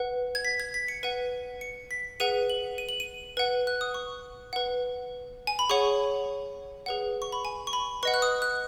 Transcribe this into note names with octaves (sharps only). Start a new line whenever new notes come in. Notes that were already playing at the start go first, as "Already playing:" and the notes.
Already playing: B4 F#5
G#6
B6
G#6
B6
C#7
B4 F#5 D#7
C#7
B6
G#4 B4 F#5 D#7
F#7
D#7
F#7
D#7
B4 F#5
F#6
D#6
C#6
B4 F#5
G#5
B5
G#4 C#5 F#5 C#6
G#4 B4 F#5
C#6
B5
G#5
C#6
B5
B4 D#5 F#5 C#6
F#6
D#6
F#6